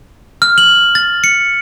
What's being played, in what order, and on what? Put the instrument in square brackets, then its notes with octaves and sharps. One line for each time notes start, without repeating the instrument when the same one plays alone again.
[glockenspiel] F6
F#7
A6
C#7